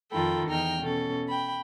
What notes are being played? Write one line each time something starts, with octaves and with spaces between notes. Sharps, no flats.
F2 D#3 F4 A4 G5 B5
E2 D#4 G5 F6
B2 C#4 A4
G5 B5